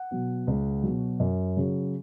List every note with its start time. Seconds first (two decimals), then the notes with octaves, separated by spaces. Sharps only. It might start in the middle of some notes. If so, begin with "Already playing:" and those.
Already playing: F#5
0.11 B2 F#3
0.47 C#2
0.83 B2 F#3
1.20 F#2
1.57 C#3 F#3